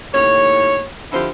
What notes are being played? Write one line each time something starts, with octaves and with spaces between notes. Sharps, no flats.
D#2 A2 C#5
D3 F3 E4 G4 C5